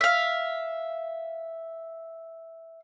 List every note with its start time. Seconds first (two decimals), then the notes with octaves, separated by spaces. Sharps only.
0.01 E5 F5